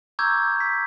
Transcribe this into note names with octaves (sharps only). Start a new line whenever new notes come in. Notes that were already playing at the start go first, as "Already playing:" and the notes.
A#5 C#6 D6 E6 G6 G#6
B6